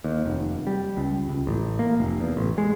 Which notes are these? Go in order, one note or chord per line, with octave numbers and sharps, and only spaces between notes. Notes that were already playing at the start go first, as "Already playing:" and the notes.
D#2
F1
G3
C#2
C#2
A1
A#3
F1
E2
A1
G#3